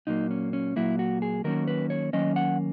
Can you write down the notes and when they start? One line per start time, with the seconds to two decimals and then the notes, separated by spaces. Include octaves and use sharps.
0.07 A#2 F#3 A#3 D#4
0.31 C#4
0.53 C#4
0.76 A#2 F#3 A#3 E4
0.99 F#4
1.22 G#4
1.44 D#3 F#3 A#3 C#4 A#4
1.68 B4
1.90 C#5
2.13 D#3 F#3 A#3 C#4 D#5
2.36 F#5